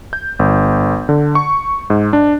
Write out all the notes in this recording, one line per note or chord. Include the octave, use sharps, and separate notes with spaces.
G6
G1
D3
C#6
G#2
D4